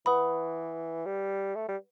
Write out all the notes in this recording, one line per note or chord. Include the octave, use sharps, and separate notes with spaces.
E3 B4 F#5 B5 D#6
G3
A3
G3